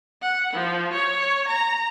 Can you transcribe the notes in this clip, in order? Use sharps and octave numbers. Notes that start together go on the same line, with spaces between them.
F#5
F3
C#5
A#5